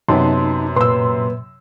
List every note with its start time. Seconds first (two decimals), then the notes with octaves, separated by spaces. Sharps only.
0.09 F#2 C3 B3 D#4 A5 C6
0.76 A#2 A#3 B4 C6 E6